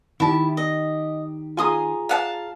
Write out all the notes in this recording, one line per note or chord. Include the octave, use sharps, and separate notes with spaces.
D#3 E4 G4 A5
D#5
F4 G#4 G#5 A#5 C6 D#6
F5 F#5 A5